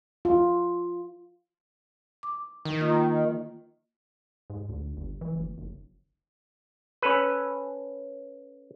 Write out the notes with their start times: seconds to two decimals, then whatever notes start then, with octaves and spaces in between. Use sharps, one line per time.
0.25 F4
2.23 D6
2.65 D#3
2.79 A#3 F4 D#5
4.50 G#2
4.69 D2
4.97 G1
5.21 E3
5.35 F#1
5.58 F#1
7.02 C#4 A4 B4